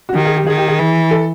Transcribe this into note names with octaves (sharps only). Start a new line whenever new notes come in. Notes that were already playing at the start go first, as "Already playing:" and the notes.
F#4
D#3 G4
G#4
G4
D#3 G#4
G4
G#4
E3
A4